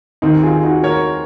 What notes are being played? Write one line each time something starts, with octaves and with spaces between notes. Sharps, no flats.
D#2 D#3 C4 D#4
F4 G#4
D#4 F#4
A#4 C#5